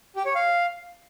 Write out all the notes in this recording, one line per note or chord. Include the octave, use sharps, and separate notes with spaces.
G4
C#5
F5